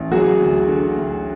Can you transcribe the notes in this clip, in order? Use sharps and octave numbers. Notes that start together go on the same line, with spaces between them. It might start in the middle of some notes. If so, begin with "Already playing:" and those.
Already playing: A1
F#3 F#4 G#4
D2
D3
D2